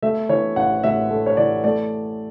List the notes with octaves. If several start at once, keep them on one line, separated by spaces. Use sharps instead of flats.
A3 E5
E3 C#5
A1 F#5
A2 E5
A3
C#5
E3 D5
A3 D5